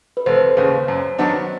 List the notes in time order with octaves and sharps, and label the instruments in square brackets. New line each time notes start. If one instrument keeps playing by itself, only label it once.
[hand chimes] B4
[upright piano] F1 [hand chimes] C5
[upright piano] D#2 C#3
F#2
D#3 F#3 B3 D4